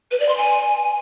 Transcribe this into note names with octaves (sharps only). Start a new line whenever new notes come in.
B4
D5
C6
G#5